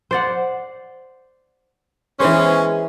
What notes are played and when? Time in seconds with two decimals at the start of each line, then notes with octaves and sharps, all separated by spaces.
0.11 C5 D5 F#5
2.20 E3 G#3 B3 C#4 C5